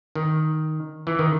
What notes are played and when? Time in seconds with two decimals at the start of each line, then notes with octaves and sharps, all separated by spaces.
0.15 D#3
1.07 E3
1.19 D#3